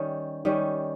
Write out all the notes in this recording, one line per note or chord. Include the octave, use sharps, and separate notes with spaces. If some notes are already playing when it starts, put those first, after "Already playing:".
Already playing: D#3 G3 C#4
D#3 G3 C#4